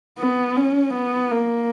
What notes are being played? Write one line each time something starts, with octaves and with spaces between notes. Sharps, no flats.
B3
C#4
B3
A#3